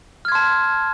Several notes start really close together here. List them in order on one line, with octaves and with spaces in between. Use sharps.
F6 G#6 C6 A5